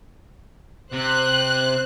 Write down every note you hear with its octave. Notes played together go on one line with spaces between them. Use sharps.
C3 C5 F#6